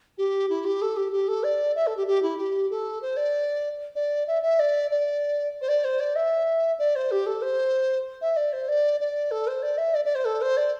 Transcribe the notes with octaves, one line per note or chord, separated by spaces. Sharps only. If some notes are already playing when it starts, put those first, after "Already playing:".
G4
E4
G4
A4
G4
G4
A4
D5
E5
A4
G4
G4
E4
G4
A4
C5
D5
D5
E5
E5
D5
D5
C5
D5
C5
D5
E5
D5
C5
G4
A4
C5
E5
D5
C5
D5
D5
A4
C5
D5
E5
D5
D5
C5
A4
C5
D5